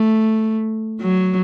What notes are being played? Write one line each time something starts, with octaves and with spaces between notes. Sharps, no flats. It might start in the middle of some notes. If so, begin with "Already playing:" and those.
Already playing: A3
F#3